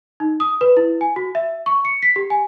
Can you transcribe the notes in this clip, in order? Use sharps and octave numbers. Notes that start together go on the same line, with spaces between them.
D#4
D#6
B4
E4
G#5
F#4
E5
C#6
C#7
B6
G4
G#5